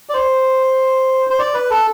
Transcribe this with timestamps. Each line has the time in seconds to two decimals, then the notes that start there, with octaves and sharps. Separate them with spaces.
0.09 D5
0.14 C5
1.30 C5
1.39 D5
1.54 B4
1.70 A4